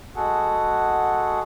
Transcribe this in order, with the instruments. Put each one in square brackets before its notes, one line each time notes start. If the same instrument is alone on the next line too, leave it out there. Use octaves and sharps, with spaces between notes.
[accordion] G#3 F#4 G#4 A4 F#5